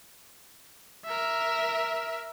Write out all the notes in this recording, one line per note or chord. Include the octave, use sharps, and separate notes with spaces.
A#4 E5